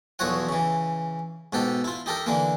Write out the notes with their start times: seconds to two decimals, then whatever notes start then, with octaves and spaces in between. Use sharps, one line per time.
0.19 B1 E2 F3 F#4 C#5 F#5
0.49 C#3 E3
1.53 G#2 B2 G4 A4
1.84 E4 F4
2.06 D#4 G4 A4 A#4
2.26 D3 E3 A#3